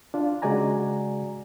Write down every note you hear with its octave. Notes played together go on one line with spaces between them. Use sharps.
D4 F4
C#3 G#3 F#4 D5 G#5 A#5